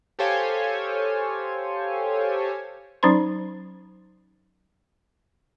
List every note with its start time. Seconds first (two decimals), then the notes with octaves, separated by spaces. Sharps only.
0.19 G4 A4 C5 C#5 F5 G#5
3.03 F#3 C#4 D#4 C5 C6